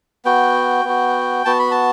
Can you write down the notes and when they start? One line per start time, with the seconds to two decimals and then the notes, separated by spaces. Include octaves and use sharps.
0.25 B3 F#4 G5
0.85 B3 F#4
1.45 B3 F#4 A5
1.59 B5
1.71 A5